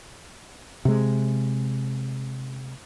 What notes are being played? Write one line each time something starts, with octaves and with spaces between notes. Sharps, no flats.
C3 G#3